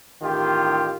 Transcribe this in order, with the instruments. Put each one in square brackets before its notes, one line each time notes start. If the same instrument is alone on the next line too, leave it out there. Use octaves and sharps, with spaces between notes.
[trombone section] A1 D#3 F4 G4